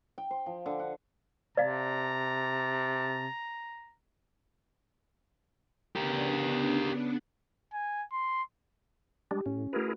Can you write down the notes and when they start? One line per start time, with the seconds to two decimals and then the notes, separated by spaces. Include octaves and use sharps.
0.18 G5
0.31 C5
0.46 F3
0.66 D3
0.79 F#5
1.57 C3 D5 F5 A5 A#5
5.96 C#3 B3 D4 G4 A#4
7.73 G#5
8.12 C6
9.31 G3 G#3 D4 G4
9.46 A2 C#4
9.73 A3 E4 F#4 G#4 A#4 B4